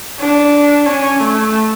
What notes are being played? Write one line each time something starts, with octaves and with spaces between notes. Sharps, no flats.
D4
C#4
A3